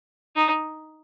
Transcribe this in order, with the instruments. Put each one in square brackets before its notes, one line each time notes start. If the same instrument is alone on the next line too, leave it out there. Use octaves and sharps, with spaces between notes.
[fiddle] D#4